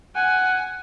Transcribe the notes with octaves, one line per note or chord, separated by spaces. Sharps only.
F#5 G#5